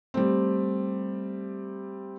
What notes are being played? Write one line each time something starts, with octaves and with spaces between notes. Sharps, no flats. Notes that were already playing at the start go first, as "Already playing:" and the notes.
G3 A3 C4